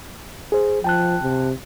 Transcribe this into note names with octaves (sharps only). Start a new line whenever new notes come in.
G#4 C5
F3 G5 A5 F#6
C3